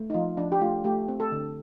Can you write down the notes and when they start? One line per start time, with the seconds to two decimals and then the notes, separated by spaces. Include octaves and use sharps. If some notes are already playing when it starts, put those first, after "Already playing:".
Already playing: A3
0.10 D#4
0.14 F3 F4
0.37 F3 D4
0.52 G4
0.60 A3 F4
0.84 A3 G4
1.08 C4
1.20 A4
1.32 D3